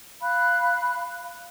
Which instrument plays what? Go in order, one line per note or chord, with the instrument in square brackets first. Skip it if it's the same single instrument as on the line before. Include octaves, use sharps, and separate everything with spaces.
[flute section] F5 B5 F#6